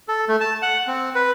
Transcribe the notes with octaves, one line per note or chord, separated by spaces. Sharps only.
A4
A3
A5
F#5
C4
B4